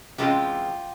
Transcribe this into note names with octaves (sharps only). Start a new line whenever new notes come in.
C3 E3 G#3 C#4 F4 G4